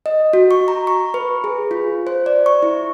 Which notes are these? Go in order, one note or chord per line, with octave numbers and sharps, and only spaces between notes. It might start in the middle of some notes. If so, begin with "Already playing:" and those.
D#5
F#4
C#6
A#5
C#6
B4
G#4
F4
C5
D5
C#6
E4